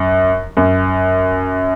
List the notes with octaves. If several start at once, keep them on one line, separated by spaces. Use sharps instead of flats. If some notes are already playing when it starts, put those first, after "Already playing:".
Already playing: F#2
F#2